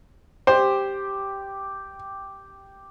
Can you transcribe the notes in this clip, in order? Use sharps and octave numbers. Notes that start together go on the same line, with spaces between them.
G4 C5